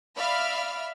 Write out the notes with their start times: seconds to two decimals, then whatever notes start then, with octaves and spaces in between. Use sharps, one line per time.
0.17 D5 E5 F5 B5 F6